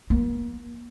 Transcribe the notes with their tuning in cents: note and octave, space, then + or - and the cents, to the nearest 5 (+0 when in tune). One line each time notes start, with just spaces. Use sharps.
A#3 +40